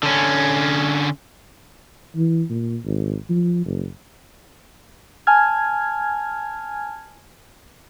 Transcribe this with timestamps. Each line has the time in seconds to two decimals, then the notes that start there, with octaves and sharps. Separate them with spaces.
0.03 D3 C#4
2.16 E3
2.50 A#2
2.85 G#1
3.29 F3
3.65 F#1
5.27 G#5 A5 F6 G#6